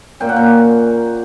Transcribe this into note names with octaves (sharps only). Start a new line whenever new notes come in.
A#2 A#3 C#4 G5
F#5
G5